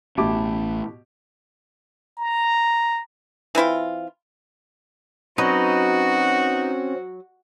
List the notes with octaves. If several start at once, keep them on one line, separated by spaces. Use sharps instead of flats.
A1 B2 A3 C#4 E4 G4 A5 D6
A#5
E3 C4 E4 F4
F#3 C4 C#4 D#4 F#4 B4 D#5